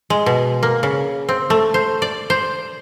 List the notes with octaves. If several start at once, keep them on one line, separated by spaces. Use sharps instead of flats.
G#3
B2
A#3
C#3
C4
A3
C5
D5
C5